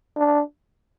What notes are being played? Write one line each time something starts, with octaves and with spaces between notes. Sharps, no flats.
D4